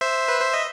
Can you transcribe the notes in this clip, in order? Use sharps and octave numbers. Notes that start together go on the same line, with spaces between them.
C5 E5
B4
C5
D#5